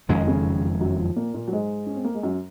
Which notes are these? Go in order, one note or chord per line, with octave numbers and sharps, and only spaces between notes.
F#1 F2 D#3 G#3 C#4
D#4
C#3 C#4
F#2 F#3
F3
A#2 A#3
A#2 A#3
F#3
G#2 G#3
C#4
C4
A#3
G#3
F#2 F#3